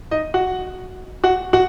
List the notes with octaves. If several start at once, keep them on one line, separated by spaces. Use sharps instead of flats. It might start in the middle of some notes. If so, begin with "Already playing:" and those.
D#4 D#5
F#4 F#5
F#4 F#5
F#4 F#5